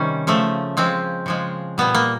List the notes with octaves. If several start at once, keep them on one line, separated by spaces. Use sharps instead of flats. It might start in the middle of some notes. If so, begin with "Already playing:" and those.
Already playing: C3 D#3 G3 C#4
C#3 F3 A3
C#3 F3 G#3 C4
C#3 F3 G#3
A#2 G3 B3
A#3